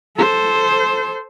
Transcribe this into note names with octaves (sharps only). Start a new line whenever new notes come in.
A4 C5